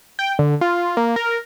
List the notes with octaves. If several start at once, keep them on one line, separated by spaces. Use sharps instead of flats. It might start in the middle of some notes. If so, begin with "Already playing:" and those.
G5
D3
F4
A#3
A#4